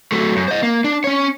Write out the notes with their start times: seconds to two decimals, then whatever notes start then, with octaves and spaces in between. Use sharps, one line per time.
0.12 F#3 A3
0.36 F#2
0.48 C5 D#5
0.63 A#3
0.84 D4
1.04 C#4 C#5